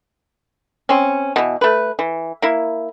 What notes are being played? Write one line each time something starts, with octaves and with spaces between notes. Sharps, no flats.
C4 C#4
B2 E3
A3 B4
E3
A#3 E4